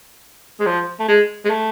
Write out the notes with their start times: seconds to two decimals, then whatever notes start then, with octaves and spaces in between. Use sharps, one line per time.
0.60 G#3
0.66 F3
1.00 A3
1.08 G#3
1.45 G#3
1.50 A3